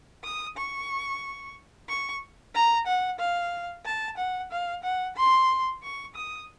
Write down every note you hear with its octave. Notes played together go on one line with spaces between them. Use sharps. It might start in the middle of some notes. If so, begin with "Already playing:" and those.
D#6
C#6
C#6
A#5
F#5
F5
A5
F#5
F5
F#5
C6
C#6
D#6